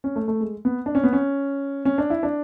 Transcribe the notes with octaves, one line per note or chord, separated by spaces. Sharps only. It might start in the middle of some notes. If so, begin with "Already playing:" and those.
C#4
A3
A3
G#3
B3
D4
C#4
B3
C#4
C#4
D4
E4
D4